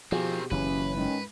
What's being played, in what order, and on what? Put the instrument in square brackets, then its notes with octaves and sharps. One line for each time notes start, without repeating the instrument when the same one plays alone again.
[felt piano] B2 G4 G#4 [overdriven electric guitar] D#3 C4 [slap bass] F3
[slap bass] F#1 E3 [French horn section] C#4 [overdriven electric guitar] B4
[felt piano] G#2 [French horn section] D#3 C#4